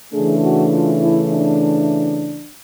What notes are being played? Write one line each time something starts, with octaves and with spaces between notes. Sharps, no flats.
C#3 E3 A3 D4 G#4
F#4
F4
E4
D4